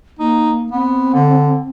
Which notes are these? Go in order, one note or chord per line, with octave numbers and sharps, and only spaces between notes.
A#3 D#4
B3 C4
D3